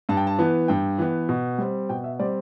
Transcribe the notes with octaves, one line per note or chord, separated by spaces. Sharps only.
G2 A5
G5
A5
E3 B3
G2 G5
E3 B3
B2
G3 C4
B2 G5
E5
G3 C4 D5